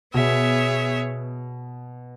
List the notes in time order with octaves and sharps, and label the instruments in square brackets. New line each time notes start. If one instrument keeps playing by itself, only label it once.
[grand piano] B2 [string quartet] B3 G#4 C#5 E5